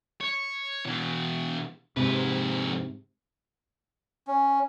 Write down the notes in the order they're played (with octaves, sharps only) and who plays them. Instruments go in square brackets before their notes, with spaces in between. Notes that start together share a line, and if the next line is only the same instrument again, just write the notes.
[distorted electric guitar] C#5
B2 E3
[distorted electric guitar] F2 B4 [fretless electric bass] G#2 C3
[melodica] C#4